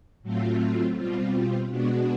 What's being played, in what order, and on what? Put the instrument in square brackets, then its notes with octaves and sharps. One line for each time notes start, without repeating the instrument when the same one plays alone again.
[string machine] A2 F#3 A3 C4 F4
B2 G3 C4 F4
B2 G#3 B3 D4 F#4